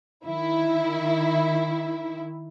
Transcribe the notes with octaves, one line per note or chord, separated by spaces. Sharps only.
D#3 E4